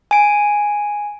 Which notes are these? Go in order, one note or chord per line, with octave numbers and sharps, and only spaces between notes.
G#5 D7